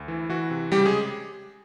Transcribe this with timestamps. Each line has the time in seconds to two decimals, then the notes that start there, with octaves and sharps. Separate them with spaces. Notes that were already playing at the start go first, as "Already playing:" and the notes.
Already playing: D2
0.08 E3
0.29 E3 F#4
0.50 C3
0.72 C#3 G3 G4
0.86 G#3 G#4